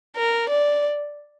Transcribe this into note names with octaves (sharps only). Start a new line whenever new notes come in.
A#4
D5